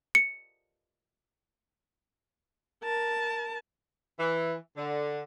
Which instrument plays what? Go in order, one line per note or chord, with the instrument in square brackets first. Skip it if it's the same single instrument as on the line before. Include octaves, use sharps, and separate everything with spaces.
[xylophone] C#7
[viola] A#4 A5
[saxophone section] E3
D3